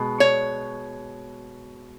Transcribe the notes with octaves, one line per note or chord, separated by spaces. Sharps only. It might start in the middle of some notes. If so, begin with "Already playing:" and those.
Already playing: B2 G#3
C#5